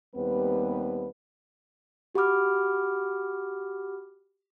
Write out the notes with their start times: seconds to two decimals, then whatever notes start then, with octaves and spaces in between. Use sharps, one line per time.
0.15 D#2 G3 B3 C4 B4
2.15 F#4 G4 F#5 B5 D6 F6